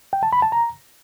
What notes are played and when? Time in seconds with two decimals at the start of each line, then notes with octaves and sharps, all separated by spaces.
0.13 G5
0.23 A5
0.33 B5
0.42 A5
0.52 A#5